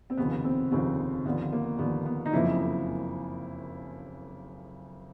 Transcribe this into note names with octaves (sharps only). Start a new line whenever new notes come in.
C4
F1 D#2 C#3 F3 B3
C4
F1 D#2 C#3 F3 C4
D#2 D3 F3 B3
A#3
D#2 D3 F3 B3
B3
D#4
F#1 F2 C#3 F3 A#3 E4